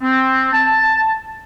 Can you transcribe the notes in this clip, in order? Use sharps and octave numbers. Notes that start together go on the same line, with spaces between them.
C4
A5